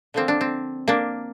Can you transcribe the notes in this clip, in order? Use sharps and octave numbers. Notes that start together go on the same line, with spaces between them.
D3 F3 A#3 C4
D4
C4
A#3 D4